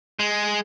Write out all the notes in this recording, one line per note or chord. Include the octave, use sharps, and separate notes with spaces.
G#3